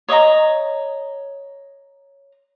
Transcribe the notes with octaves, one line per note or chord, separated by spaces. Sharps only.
C#5 D#5 E5 A#5